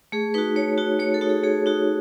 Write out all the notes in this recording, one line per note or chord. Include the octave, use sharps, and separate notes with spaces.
A3 G#4
D#4 F#4 B4
A3 C#5
D#4 F#4
A3 C#5
A4
D#4 F#4
G#4
A3 G#4
D#4 F#4